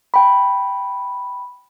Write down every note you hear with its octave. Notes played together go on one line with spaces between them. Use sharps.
G5 B5